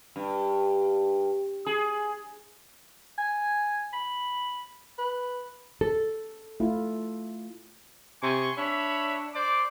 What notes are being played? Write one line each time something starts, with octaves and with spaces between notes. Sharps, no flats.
G2
G#4
G#5
B5
B4
A4
A3 E4 F4
C3 G#5 C6 C#6
D4 C#5 E5 B5
C5 D5 D6